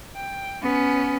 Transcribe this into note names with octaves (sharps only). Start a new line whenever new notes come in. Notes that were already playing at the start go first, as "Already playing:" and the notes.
G5
B3 C#4